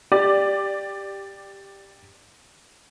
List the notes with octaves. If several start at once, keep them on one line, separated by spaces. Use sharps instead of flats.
G4 D5